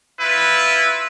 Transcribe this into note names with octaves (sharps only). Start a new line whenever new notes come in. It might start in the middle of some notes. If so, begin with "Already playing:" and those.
E4 F4 B4